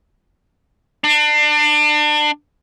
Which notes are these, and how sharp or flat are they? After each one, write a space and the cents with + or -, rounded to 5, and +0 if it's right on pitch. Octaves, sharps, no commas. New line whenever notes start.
D4 +30